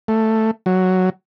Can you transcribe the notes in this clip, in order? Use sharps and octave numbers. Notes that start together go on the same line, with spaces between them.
A3
F#3